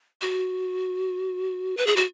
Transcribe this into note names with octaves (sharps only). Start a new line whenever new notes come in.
F#4
B4
G#4
F#4